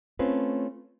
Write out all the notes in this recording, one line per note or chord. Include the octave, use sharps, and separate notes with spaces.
A3 C4 C#4 F4 B4